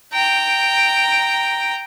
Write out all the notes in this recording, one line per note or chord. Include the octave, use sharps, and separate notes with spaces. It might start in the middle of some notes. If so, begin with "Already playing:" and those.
G5 A#5